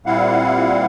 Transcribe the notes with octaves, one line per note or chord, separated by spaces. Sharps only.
A#2 G3 C4 E4 F5 F#5